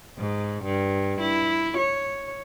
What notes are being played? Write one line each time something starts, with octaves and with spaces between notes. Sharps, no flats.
G#2
G2
E4
C#5